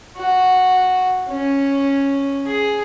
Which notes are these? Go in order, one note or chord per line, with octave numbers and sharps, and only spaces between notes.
F#4
C#4
G#4